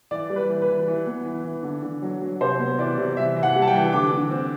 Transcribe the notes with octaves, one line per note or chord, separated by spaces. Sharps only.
E3 D5
G3
B4
E3
B4
E3
E3
B3
E3
E3
D3
D3
F#3
F#3
C3 C5
B3
E3 D5
C3
E3 E5
E3
F#5
G3
A5
G5
E3
D3 D6
D3
C4